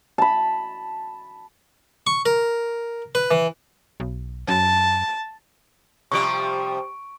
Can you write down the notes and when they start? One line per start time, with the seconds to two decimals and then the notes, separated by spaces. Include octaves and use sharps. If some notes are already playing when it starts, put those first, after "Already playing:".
0.18 A5 B5
2.07 C#6
2.26 A#4
3.15 B4
3.31 E3
4.00 B1
4.48 F#2 A5
6.12 C3 F3 G3 C#6 D7